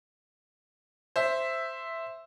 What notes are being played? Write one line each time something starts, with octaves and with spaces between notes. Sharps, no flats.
C5 E5